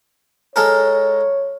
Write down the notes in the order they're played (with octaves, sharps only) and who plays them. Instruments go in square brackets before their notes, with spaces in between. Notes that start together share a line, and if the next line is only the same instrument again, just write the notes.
[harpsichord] G#3 A4 A#4 [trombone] C#5